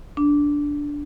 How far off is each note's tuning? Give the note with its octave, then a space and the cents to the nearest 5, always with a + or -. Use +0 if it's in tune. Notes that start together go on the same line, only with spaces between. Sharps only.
D4 -10